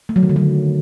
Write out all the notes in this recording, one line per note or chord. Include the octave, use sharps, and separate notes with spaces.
A3
F#3
D#3
D3
F#3